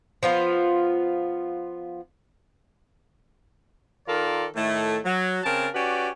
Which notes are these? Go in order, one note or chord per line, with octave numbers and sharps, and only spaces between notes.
F3 B3 F4
D#3 F4 A4 A#4 D5
A2 D#3 A3
F#3
C#3 C4 A#4 A5
C#4 F#4 G4 B4 D5